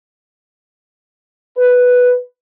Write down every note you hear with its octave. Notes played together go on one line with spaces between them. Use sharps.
B4